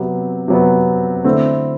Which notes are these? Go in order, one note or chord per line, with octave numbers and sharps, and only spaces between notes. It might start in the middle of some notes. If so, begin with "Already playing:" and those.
Already playing: C3 F#3 B3
C3 F#3 B3
D3 A3 C4 E4